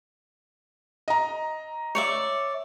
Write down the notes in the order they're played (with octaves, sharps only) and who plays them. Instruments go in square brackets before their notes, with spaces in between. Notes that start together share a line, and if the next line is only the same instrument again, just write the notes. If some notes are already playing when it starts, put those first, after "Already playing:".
[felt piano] D#5 A#5
[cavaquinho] C#5 D5 E5